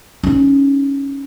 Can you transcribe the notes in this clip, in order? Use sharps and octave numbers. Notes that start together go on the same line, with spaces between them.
C#4 D#4